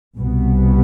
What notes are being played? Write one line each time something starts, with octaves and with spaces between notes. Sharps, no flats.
C2 B2 B3